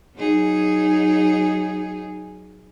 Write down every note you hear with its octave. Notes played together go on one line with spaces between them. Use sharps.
F#3 D#4 G#4